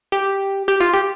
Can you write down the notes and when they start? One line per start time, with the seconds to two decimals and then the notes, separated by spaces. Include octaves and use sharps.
0.12 G4
0.68 G4
0.80 F4
0.94 G4